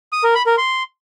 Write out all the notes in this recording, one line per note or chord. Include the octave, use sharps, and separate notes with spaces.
D#6
A#4
B5
A#4
C6